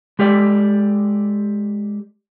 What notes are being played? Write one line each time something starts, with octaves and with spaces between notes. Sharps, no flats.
G#3 G4 A4 D5